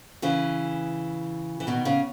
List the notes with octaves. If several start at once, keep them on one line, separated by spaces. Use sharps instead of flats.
C#3 E3
E3
B2 D#3
C#3